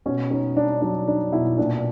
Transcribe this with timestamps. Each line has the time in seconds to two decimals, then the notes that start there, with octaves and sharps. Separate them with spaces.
0.06 B2 C#4
0.30 C#4 D#4
0.57 D4 D#4
0.82 F#3 D4
1.07 D4 D#4
1.32 B2 E4
1.57 A#2 D4